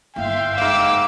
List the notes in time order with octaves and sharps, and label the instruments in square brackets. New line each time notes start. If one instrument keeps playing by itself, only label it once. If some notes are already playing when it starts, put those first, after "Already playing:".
[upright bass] G1 E4 [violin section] E5 F5 C6 [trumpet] G5
[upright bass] F#1 [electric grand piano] G#2 F5 [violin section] D6 E6